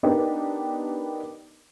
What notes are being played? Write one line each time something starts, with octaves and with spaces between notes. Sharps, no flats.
B3 D4 D#4 G4 A#4 B4